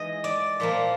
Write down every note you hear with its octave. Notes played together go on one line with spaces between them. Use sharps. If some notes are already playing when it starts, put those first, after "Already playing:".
Already playing: E3 G#3 D#4 D#5
D5
A#2 F3 A#3